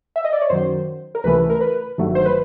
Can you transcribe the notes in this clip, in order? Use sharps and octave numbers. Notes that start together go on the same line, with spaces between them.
E5
D#5
D5
C#5
F#2 D#3 F#3 C5
A#4
C#2 C3 E3 A3 B4
A#4
B4
G1 G2 D#3 F#3 A3
C5
B4